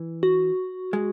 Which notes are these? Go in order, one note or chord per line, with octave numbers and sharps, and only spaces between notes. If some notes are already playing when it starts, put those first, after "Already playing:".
Already playing: E3
F#4
G#3